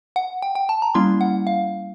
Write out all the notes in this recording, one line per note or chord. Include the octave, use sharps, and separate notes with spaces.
F#5
G5
G5
A5
A#5
G3 A#3 C#4 E4 C6
F#5
F5